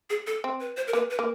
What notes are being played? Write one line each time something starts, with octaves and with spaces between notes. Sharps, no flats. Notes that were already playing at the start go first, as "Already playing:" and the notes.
G#4
A4
C4
B4
C5
A#4
A#3 B4
B4
A#3